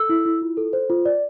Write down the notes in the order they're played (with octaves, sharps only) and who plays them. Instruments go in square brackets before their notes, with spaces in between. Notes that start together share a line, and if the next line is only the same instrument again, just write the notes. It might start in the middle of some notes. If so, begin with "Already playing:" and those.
Already playing: [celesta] A4 E6
E4
E4
F4
A4
C5
F4
D5